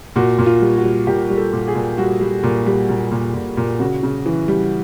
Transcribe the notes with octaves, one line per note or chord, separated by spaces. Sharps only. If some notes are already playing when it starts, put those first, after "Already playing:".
A#2 F#4
A#2
F4
G3
F#4
G3
A#2 G4
G3
A4
A#2
G#4
A#2
G3 F#4
G3
A#2
G3
A#2
A#2
A#2
A#2
C#3 F#4
C#3
E3
G3